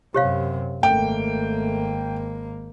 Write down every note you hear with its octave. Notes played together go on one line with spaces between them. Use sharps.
F#2 C3 G4 C#5 F5
G#1 A3 A#3 G5